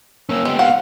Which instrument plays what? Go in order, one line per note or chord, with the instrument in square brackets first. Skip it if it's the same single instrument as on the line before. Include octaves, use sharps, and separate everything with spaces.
[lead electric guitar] A#3 C#4 [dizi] E6
[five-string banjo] G#3 [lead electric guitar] B3 G4
[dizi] F5 [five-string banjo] F#5